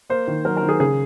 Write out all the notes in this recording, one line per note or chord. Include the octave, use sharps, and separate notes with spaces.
A#3 C5
D#3
F#3 A#4
A#4
D#3
G#4
C#3 G#4